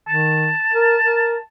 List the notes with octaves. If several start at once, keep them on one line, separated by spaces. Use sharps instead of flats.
D#3 A5
A#4
A#4